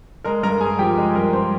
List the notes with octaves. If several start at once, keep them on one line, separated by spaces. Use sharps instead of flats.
G#3 A#4 A#5
G2 A#4 A#5
G2 G#4 G#5
F3 G4 G5
G#3
G2 A#4 A#5
G2 C5 C6